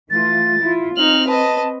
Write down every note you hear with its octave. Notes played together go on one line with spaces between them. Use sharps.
E3 A3 F4 A6
E4 F4
C4 D#4 F6 F#7
B4 D#5 A5